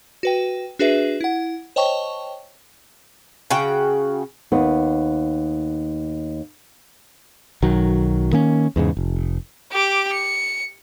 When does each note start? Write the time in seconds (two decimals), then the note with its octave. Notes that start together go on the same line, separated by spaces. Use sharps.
0.23 F#4 B4 G5
0.79 D4 F#4 G#4 B4 E5
1.21 E4 F#5
1.76 C5 C#5 D#5 G5 A5 C#6
3.50 C#3 F#4 G5
4.52 D#2 B3
7.62 B1 D#3 F#3
8.33 D#3 A#3 C#4
8.76 E2 G#2 C#3
8.97 F1
9.72 G4 D6
10.13 C#7